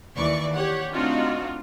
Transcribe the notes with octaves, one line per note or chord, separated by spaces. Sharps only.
D#2 E3 D5 C#6
G4 C#5 F#5
A3 C4 D4 D#4 F4 F#4